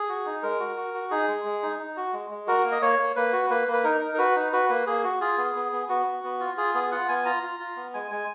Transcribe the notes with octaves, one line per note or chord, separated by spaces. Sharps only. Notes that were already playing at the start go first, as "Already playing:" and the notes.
Already playing: G#4
F#4
D#4
G#3 A#4
F#4
F#4
F#4
D#4 G#4
G#3
G#3
D#4
D#4
F#4
G#3
G#3
F#4 A#4
A#3
D#5
A#3 C#5
A#3
A#3 B4
F#4
A#3 B4
A#3
B4
D#4 A#4
D#4
A#4
F#4 B4
D#4
F#4 B4
A#3 B4
A#3 G#4
F#4
F4 G#4
B3
B3
B3
B3 F#4
B3
B3
F4
F4 G#4
B3 G#4
F4 F#5
B3 G#5
F4 A#5
F4
F4
B3
G#3 G#5
G#3 G#5